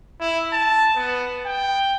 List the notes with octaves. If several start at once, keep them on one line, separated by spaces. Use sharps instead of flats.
E4
A5
B3
G5